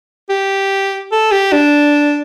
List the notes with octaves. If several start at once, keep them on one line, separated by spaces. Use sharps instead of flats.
G4
A4
G4
D4